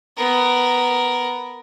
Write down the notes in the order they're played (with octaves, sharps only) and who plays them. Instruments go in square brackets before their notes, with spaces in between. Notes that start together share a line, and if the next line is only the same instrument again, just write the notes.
[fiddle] B3 A#4